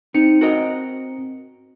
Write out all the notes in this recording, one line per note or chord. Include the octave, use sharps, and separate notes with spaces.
C4 D#4 C#7
F#4 A#4 D#5